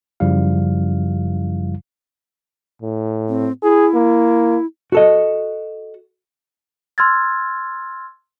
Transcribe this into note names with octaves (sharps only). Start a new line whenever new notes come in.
F#2 C#3 F3 G3 E4 F5
A2
C4
E4 G#4
A#3
F#4 A4 D#5
C6 E6 F6 G#6 A6